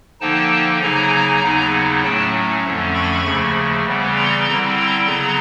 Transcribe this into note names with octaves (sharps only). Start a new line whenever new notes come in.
D3 F3 A#3 D#4 G5 A5
C#3 F#3 A#3 D#4 G#5 A#5
D#2 C#3 F#3 B3 D#4
A2 F#3 A3 C#4 G5 A5
F2 D3 F3 A3 C#4
B5 C#6
D#2 C#3 F3 A3
C#3 E3 G3 B3
A#5 C6
D3 G3 C4 E4
A#5 C6
C#3 F#3 B3 A#5 C6